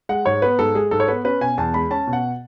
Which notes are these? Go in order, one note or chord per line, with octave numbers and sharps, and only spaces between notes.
G#3 F#5
G#2 C#5
B3 B4
G#2 A4
G#3 G#4
G#2 A4
C#5
B3 B4
C#4 B4
B2 G#5
E2 A5
G#3 B5
C#4 A5
B2
F#5